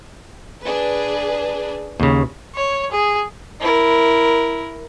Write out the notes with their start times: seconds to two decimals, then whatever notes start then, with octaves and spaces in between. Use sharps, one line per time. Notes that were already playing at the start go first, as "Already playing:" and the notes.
0.62 D4 G#4 B4
2.00 D#2 C#3
2.55 C#5
2.92 G#4
3.60 E4 A#4